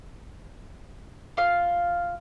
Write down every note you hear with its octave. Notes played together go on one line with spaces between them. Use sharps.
F4 F5